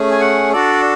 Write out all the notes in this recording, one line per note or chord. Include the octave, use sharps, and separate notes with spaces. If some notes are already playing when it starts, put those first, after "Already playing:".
Already playing: A3 C#4 G#4
G#5
F#5
D4 F#4 A4 D5